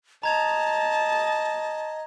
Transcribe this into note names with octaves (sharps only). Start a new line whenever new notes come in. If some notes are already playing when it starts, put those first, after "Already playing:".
D#5 A5 A#5 G#6 F7